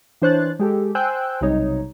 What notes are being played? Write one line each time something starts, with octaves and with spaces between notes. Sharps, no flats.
E3 D4 C5 C#5 F#6 A6
G#3 G4 A4
C5 G5 G#5 E6 F#6 G6
B1 C3 G3 D#4 C#5